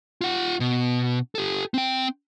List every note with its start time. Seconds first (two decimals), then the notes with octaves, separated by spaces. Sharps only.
0.21 F4 F#5
0.60 B2
1.35 G4 A4
1.74 C4 G5